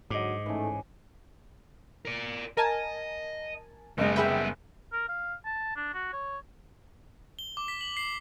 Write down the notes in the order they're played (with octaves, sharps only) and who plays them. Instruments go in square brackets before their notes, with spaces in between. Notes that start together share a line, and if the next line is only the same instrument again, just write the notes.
[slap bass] G#2 [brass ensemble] D3 F#3 [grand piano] D#5 D6
[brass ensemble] A2 A3 D#4 [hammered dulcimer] E3 C#4
[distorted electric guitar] A#4 D5
[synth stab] A#4 G#5 A5 [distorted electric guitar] D#5
[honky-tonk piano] F#1 G#3 [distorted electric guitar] G3 B3 [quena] D#5
[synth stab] G#4 B4 G5 [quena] E5
[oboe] A#4
F5
A5
D4
F#4
C#5
[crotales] G7
D6
B6
F#7
C7